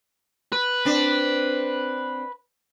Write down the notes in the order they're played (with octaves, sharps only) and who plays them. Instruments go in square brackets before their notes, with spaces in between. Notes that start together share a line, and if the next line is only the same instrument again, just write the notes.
[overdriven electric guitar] B4
[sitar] C4 D4